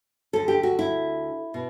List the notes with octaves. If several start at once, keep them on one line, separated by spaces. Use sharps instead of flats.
D2 D3 A4
G4
F#4
E4
B2